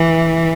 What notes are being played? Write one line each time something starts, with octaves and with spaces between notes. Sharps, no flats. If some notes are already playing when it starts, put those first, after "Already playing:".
Already playing: E3